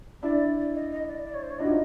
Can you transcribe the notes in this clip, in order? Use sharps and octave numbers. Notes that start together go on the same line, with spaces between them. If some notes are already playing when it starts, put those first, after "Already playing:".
D4 E4 D5
D#5
D#5
D5
D5
C#5
C5
C#5
D4 E4 D#5
F#4
D#4 F4